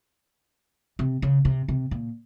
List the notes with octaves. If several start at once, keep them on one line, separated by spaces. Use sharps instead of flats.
C3
C#3
C3
C3
A#2